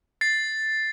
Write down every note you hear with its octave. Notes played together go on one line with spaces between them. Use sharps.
A6 C7